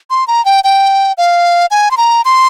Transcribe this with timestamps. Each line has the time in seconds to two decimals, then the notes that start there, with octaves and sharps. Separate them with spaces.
0.10 C6
0.27 A#5
0.45 G5
0.64 G5
1.18 F5
1.71 G#5
1.91 C6
1.97 A#5
2.25 C6